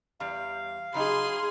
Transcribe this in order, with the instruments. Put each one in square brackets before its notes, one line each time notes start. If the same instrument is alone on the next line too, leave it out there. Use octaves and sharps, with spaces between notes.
[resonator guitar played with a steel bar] E2 G3 [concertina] F5
[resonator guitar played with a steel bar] C#3 F#3 D#4 [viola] G#4 C6